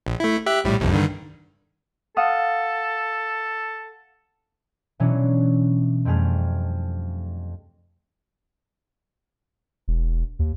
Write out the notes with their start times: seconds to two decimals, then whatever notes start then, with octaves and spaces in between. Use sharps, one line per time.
0.06 A#1
0.20 A3 E4
0.46 G4 E5 F#6
0.64 A#1 A2 G3
0.80 G1 C2 F2
0.92 G2 D3 D#3
2.17 A4 F5 F#5 D#6
5.00 B2 E3 F#3 C#4 D4
6.05 F2 G3 A3 G#4 F6
9.88 E1
10.39 D#2